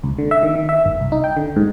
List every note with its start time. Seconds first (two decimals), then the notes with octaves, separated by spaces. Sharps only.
0.03 C#2
0.18 D3
0.31 E5
0.43 D#3
0.55 D#3
0.69 E5
0.86 G1
1.00 C2
1.12 D#4
1.24 G5
1.37 D3
1.56 G#2